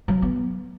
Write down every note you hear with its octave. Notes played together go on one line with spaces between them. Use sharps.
F#3
B3